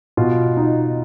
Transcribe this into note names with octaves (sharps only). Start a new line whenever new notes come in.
B2 F4
D#4